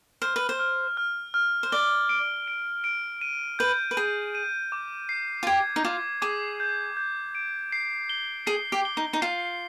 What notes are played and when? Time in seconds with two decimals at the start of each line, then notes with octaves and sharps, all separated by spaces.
0.22 C5 F6
0.36 B4
0.49 C5
0.59 F6
0.97 F6
1.34 F6
1.63 C5
1.72 D5 G7
2.09 D7
2.48 D7
2.84 D7
3.21 D#7
3.59 B4 G6
3.91 B4
3.97 G#4 G6
4.35 D#7
4.72 D6
5.09 C7
5.43 F4
5.47 G4 G#6
5.76 D#4
5.85 F4 D6
6.22 G#4 D6
6.60 G6
6.97 G6
7.35 D7
7.72 C7
8.09 G7
8.47 G#4 C7
8.72 G4
8.85 G7
8.97 D#4
9.13 D#4
9.22 F4 C7